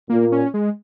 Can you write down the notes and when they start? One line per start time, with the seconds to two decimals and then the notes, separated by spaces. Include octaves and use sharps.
0.09 A#2 A#3
0.32 C#4
0.54 G#3